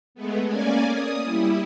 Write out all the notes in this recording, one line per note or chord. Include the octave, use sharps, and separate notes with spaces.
G#3 A3 B3
A#3 C#4 D5 G#5
D#6
G3 E4